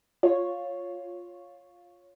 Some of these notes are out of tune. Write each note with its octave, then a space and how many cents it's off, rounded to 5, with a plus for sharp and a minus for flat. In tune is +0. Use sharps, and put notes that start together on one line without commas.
F4 +10 C#5 +0